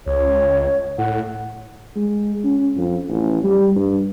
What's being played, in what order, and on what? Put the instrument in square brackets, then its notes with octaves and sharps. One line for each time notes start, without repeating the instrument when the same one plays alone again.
[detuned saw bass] C#2 [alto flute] C#5
[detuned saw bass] A2 [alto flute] F#5
[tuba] G#3
C#4
F2
A1
G3
G2